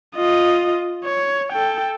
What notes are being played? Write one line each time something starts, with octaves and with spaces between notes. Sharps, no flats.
F4 D#5
C#5
A4 G5